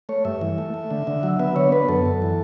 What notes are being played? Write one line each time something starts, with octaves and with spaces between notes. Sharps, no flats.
A3 C#5
G2 E5
E3
A3
A3
D3
D3
F#3
B3 E5
D3 C#5
B3 B4
F#2 A4
F#2
E3